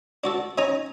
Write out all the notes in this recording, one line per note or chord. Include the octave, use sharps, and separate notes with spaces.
D4 F#4 A4
C#4 D#4 C#5 D#5 G#5 A#5